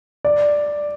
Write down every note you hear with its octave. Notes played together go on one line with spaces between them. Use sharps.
D5